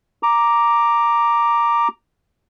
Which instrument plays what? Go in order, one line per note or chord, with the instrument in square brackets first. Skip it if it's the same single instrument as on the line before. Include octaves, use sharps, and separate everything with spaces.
[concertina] A#5 D6